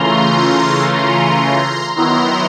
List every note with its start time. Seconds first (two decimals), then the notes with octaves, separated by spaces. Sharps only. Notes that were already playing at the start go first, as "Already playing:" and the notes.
Already playing: C#3 E3 A3 C#4 F4 A#5 C6
0.93 A#5 C6
1.96 D#3 F#3 B3 E4 A#5 C6